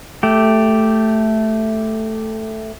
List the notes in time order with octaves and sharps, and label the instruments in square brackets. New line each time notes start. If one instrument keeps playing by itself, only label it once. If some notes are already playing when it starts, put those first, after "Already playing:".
[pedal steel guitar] A3 G4